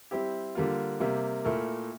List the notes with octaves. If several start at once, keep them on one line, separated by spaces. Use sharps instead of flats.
G3 C4 E4 G4
D3 G3 A#3 F4
C3 G3 A#3
A#2 A3 E4 A#4